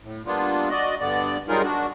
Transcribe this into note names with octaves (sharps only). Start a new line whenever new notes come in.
A2
G3 A#3 B3 D4 F4
F#4 D5 D#5
G2 D3 B3 D5
F#3 G3 D#4 F4 G#4 A#4
D4 F#4